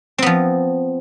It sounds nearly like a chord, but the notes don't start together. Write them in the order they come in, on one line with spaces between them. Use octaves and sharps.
C4 B3 F3